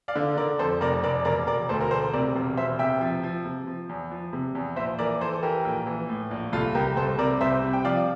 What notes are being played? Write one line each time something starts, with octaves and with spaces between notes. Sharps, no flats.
D5 F5
D3
D3 A#4 D5
F2 A4 C5
F1 A#4 D5
F1 A#4 D5
E1 A#4 D5
E1 A#4 D5
D2 A4 C5
A#4
E1 A4 C5
C3 A#4 D5
E1
E1 C5 E5
C3 E5 G5
F3
F3
C3
F3
E2
F3
C3
E2
A#1 C5 E5
E3 A#4 D5
E3 A4 C5
A4
E3 G4 A#4
A#1
E3
A2
A#1
C2 F4 A4
C2 G4 A#4
C2 A4 C5
C3 A#4 D5
C2 C5 E5
C3
G5
F3 D5 F5